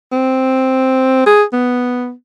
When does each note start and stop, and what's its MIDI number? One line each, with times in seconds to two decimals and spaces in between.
0.12 1.24 60
1.26 1.43 68
1.53 2.12 59